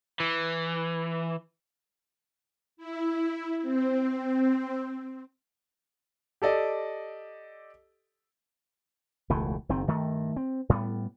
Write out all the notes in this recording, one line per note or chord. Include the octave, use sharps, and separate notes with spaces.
E3
E4
C4
G4 A4 D5 D#5
E1 C#2 E3 A3
F#1 D#3 C4
G2 D#3 A3
C4
A2 G3 B3